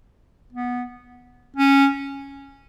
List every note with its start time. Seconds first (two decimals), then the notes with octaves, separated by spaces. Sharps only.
0.52 B3
1.56 C#4